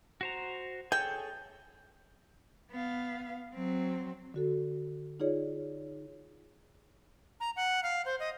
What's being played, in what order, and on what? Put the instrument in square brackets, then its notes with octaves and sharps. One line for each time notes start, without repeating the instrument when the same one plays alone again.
[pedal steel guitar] F#4 C5 A#5
[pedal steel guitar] G#4 A4 C#5 [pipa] G5
[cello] B3 F5
F#3 C4
[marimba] D3 F#4 A4
D#4 F4 G#4 C#5 D5
[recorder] A#5
F#5
F5
C5
D#5